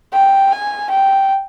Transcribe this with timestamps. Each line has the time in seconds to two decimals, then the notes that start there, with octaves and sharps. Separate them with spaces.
0.12 G5
0.52 G#5
0.90 G5